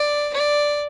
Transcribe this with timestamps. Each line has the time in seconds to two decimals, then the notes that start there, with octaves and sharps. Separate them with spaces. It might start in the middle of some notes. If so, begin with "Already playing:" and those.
Already playing: D5
0.34 D5